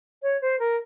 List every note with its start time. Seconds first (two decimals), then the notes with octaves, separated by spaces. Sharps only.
0.23 C#5
0.41 C5
0.60 A#4